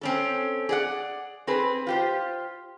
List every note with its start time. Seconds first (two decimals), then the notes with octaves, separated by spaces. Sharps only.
0.01 C4 C#4 A4
0.69 G#4 D5 F#5
1.47 C4 G#4 B4
1.87 F4 G4 C5